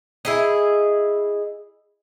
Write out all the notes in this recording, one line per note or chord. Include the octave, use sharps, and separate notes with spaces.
E4 G#4 D#5